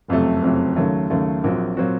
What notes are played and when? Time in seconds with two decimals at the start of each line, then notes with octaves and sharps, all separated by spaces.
0.08 F#1 F2 C3 F#3 A3
0.42 F#1 F2 C3 F#3 A3
0.76 D#2 C#3 F#3 A3
1.10 D#2 C#3 F#3 A3
1.44 A#1 A#2 F#3 C4 F#4
1.77 A#2 F#3 C4 F#4